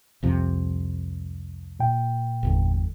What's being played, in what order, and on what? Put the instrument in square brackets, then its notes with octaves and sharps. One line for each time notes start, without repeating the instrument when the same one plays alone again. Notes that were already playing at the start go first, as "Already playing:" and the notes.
[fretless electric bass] C2 F2 C3
[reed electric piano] A#2 G5
[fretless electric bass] G1 E2 D3